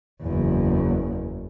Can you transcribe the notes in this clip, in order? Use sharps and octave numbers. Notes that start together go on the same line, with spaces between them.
F#1 E2